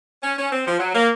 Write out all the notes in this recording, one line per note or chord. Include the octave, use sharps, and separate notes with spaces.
C#4
C#4
C4
F3
F#3
A#3